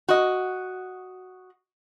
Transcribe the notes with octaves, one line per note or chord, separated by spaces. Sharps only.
F#4 D#5